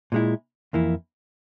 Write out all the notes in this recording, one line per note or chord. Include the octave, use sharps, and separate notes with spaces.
A#2 G#3 E4
F2 E3 A#3 E4